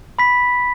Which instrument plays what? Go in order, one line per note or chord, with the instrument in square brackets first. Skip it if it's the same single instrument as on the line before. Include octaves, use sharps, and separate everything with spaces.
[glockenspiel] B5 B6